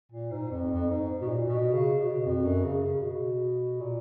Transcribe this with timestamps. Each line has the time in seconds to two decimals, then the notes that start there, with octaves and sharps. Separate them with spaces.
0.12 A#2
0.31 G#2
0.51 F2
0.70 F2
0.90 G#2
1.21 B2
1.28 A#2
1.48 B2
1.74 C#3
1.99 B2
2.25 F2
2.45 F#2
2.64 C#3
2.83 C#3
3.03 B2
3.80 A#2